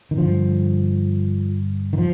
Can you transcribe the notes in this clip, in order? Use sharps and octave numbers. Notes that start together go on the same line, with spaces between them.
D#3
G2 D3 F3
D#3
F3